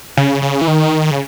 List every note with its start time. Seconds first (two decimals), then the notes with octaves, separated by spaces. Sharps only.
0.17 C#3
0.42 C#3
0.61 E3
0.68 D#3
1.11 C#3